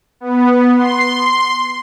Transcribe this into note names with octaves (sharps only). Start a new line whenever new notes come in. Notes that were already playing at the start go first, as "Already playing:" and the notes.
B3
C6